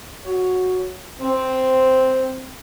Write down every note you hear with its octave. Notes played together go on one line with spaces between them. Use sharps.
F#4 C#5
C4